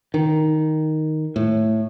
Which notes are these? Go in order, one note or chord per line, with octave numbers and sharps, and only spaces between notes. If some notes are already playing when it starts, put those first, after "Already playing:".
D#3
A2